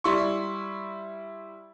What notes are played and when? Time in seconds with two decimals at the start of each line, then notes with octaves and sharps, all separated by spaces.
0.04 G3 E4 C6 C#6